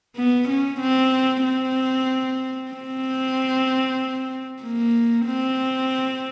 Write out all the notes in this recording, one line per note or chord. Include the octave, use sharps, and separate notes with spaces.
B3
C#4
C4
C4
C4
A#3
C4